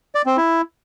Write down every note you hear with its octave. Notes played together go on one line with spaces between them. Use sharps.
D5
C4
E4